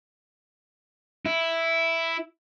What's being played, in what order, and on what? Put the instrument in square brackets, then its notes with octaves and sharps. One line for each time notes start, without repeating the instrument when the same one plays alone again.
[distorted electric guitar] E4